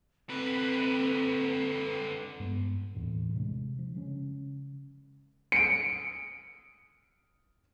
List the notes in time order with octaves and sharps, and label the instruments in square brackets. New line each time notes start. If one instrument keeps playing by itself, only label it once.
[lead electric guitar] D3 B4 [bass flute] C4
[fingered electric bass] G2 G#3 B3
E1 D#2 A2 E3
C3 G#3 D4
F3
C#3 G#3 C4 C#4
[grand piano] C#7 D7